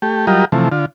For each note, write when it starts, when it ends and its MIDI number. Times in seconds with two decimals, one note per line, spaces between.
0.02 0.26 57
0.02 0.26 67
0.27 0.45 54
0.27 0.45 55
0.27 0.45 65
0.27 0.45 67
0.27 0.45 70
0.27 0.45 75
0.52 0.69 48
0.52 0.69 52
0.52 0.69 53
0.52 0.69 57
0.72 0.86 50
0.72 0.86 65